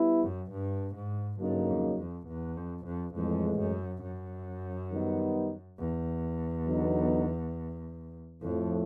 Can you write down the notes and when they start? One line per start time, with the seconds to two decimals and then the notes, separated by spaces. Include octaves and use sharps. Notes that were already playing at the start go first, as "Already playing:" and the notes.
Already playing: G3 B3 E4
0.22 F#2
0.51 G2
0.95 G#2
1.40 G2 C#3 F#3 A#3 D#4
1.69 F2
1.98 F2
2.27 E2
2.57 F2
2.85 F2
3.15 F2 A2 E3 G#3
3.59 F#2
4.02 F#2
4.91 D#3 G3 B3 D#4
5.79 E2
6.67 D3 F#3 B3 D#4
8.42 F2 A2 F3 A3